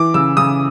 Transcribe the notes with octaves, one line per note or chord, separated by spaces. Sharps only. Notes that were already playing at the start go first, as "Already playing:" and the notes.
Already playing: E3 D6
C#3 E6
C#3 D#6